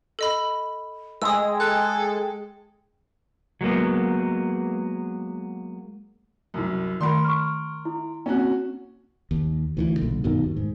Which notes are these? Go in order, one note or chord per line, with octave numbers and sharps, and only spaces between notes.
A4 D#5 B5
G#3 G#4 G5 D#6 E6
A4 F#6
F#3 G#3 A#3 B3
C2 F#2
D#3 A3 A#4 B5 C6
C#6 F6
E4
A#3 C4 C#4 F#4
D#2
D2 D#3 E3
B1 A#2 D3
G2 B2 D#3
D#2
G#2